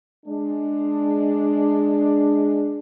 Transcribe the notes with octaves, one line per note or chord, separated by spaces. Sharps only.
G#3 D4